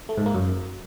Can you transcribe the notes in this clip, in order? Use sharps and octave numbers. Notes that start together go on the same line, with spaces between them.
A3
G#2
A#3
F#2